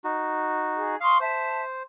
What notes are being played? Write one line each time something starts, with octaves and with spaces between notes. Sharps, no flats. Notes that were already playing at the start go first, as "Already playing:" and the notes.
D#4 F#4
G#4
F5 C6 C#6 D#6
C5 E5 A5